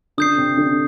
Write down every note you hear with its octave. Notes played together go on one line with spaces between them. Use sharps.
D3 D4 D#6 G6 C7
C3 C4
D3 D4